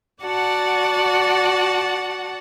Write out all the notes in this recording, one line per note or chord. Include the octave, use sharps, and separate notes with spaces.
F#4 D5 F#5 A5